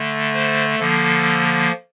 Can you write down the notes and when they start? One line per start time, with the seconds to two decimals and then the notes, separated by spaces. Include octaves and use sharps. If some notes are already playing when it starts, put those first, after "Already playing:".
Already playing: D3 A3
0.33 C5
0.79 D3 F3 A#3 A4